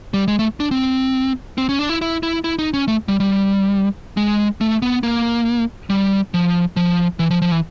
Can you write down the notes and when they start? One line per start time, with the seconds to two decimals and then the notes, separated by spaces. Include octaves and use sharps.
0.14 G3
0.28 G#3
0.39 A3
0.60 D4
0.71 C4
1.58 C4
1.69 C#4
1.79 D4
1.89 E4
2.01 E4
2.23 E4
2.44 E4
2.59 D#4
2.74 C#4
2.88 A3
3.08 G3
3.20 G3
4.17 G#3
4.61 A3
4.82 B3
5.03 A#3
5.90 G3
6.34 F3
6.76 F3
7.19 E3
7.31 F3
7.42 F3
7.52 E3